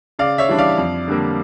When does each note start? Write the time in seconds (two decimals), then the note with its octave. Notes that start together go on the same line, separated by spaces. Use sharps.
0.19 C#3 D5 F5
0.38 C#5 E5
0.49 E3 G3 D4
0.58 D5 F5
0.77 F2
1.08 D3 G3 A#3